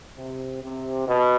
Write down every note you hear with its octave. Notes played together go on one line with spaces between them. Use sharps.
C3
C3
B2